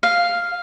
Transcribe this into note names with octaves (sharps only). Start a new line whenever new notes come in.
F5